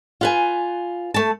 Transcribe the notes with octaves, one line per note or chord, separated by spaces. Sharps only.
F4 B4 G#5
A3 A5